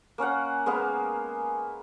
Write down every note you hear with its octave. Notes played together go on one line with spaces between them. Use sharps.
A#3 C#4 F5 F#5
G#3 A#3 B3 F5